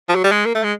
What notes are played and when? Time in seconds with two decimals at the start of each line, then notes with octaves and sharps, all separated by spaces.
0.09 F3
0.15 F#3
0.24 G3
0.31 G#3
0.46 A#3
0.55 A3
0.63 G#3